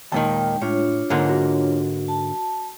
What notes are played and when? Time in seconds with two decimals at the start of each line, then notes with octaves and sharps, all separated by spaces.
0.12 D#2 A#2 D#3 G#3 G5 A5
0.62 A2 D4 F4 C#5
1.10 G#2 D3 A#3
1.29 F#4
2.08 A5